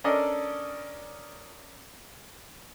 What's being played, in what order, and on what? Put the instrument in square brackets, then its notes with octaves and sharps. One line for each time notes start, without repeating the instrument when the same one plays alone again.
[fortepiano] C#4 D4 A4 A#4 D5 D#5